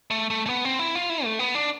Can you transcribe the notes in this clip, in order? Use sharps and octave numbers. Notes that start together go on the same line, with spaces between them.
A3
A3
A3
B3
C4
E4
F4
E4
A3
B3
D4